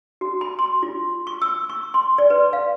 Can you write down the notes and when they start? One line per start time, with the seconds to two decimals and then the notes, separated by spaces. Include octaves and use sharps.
0.21 F#4
0.41 B5
0.59 C6
0.83 F4
1.27 C#6
1.42 E6
1.69 C#6
1.94 C6
2.18 D5
2.30 B4
2.53 F5